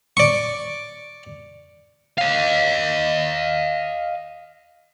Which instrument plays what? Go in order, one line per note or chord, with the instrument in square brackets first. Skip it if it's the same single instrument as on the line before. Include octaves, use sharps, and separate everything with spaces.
[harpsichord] D5 C#6
[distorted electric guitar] D#5 F5